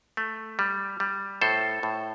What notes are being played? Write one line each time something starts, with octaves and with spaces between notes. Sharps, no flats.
A3
G3
G3
A2 A4 C5
A2